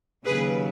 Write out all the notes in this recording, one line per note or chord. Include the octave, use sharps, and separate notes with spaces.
D#2 C#3 F#3 G#4 B4